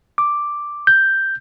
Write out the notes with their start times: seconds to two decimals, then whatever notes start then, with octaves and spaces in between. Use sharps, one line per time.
0.18 D6
0.87 G6